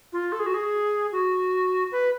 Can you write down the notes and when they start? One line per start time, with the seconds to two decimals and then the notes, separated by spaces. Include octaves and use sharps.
0.13 F4
0.32 A4
0.40 G#4
0.46 F#4
0.54 G#4
1.12 F#4
1.92 B4